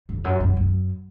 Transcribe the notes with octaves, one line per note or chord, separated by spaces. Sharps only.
F2
F#2
F#2
F#2